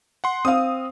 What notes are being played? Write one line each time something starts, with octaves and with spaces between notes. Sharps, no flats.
F#5 C6
C4 F5 D#6